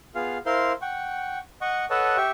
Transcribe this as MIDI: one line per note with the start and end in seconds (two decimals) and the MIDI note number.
0.15 0.38 59
0.15 0.38 65
0.15 0.38 68
0.15 0.38 77
0.46 0.73 64
0.46 0.73 70
0.46 0.73 72
0.46 0.73 77
0.46 0.73 84
0.82 1.39 78
0.82 1.39 79
0.82 1.39 85
1.61 1.85 75
1.61 1.85 78
1.61 1.85 85
1.90 2.17 69
1.90 2.17 71
1.90 2.17 73
1.90 2.17 75
1.90 2.17 78
1.90 2.17 81
2.17 2.31 67
2.17 2.31 76
2.17 2.31 79
2.17 2.31 85